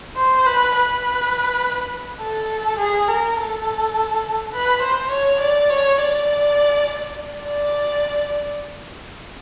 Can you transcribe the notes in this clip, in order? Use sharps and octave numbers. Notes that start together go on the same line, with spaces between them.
C5
B4
B4
A4
G#4
A#4
A4
B4
C5
C#5
D5
C#5
D5
D5